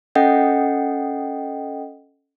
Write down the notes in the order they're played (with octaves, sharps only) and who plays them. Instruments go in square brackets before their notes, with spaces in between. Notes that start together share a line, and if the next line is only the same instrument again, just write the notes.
[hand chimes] C#4 A4 D#5 F#5 G5